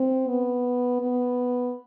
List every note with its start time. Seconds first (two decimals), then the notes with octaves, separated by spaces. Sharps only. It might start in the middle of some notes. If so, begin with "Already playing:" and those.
Already playing: C4
0.28 B3
1.01 B3